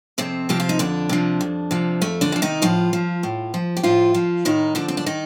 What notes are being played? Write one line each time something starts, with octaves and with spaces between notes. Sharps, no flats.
F2 C3 C4
C3 F3 G4
F4
D#4
F2 D3 D4
C3 F3
F2
C3 F3
F2 A3
D3 D4
C3 F3
D#3 D#4
A2 F3 F4
F3
A2
F3
G4
A2 F3 F4
F3
A2 D#3 D#4
D3 F3 D4
C4
D4
D#3 D#4